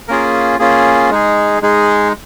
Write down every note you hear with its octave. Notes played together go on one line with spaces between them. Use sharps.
A#3 C#4 F4 G#4 A#4
A#3 C#4 F4 G#4
G#3 D#4 G#4
G#3 D#4 G#4